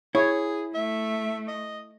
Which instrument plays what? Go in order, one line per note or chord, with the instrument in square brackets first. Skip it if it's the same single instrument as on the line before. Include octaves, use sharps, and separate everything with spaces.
[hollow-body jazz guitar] E4 [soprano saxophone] G#4 [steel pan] C#5
[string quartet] A3 [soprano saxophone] E5
[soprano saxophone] D#5